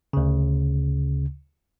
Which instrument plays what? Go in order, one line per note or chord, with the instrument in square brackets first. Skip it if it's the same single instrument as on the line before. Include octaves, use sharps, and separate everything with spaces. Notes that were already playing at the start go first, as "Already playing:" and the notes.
[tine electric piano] D2 C#3